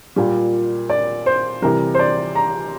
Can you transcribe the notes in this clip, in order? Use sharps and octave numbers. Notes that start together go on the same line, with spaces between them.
A#2 G3
D5
C5
C3 E3 G3 A#4
C5
D5
A#5